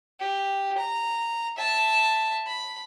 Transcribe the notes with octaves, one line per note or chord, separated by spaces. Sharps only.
G4
A#5
E5 A5
B5